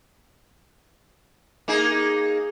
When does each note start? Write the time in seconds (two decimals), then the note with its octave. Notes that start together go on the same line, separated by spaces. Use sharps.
1.68 A#3 D#4 G#4